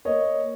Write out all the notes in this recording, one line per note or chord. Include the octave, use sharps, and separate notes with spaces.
A#3 C#5 D#5